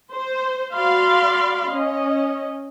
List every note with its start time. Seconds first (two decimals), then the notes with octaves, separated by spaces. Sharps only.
0.12 C5
0.73 F#4 D5 F5 B5 C6
1.70 C#4 D#5